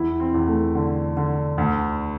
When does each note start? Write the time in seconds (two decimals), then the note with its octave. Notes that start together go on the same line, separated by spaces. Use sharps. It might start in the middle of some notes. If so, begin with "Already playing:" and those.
Already playing: E2 E4
0.20 C4
0.34 E2
0.48 A3
0.75 D3
1.17 D3
1.58 D2